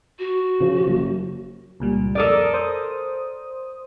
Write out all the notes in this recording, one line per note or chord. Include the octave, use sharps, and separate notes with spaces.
F#4
C#3 F3
F#1 F#2
C#2 A#2 G3
F2 A4 A#4 D5 D#6
C5 D#6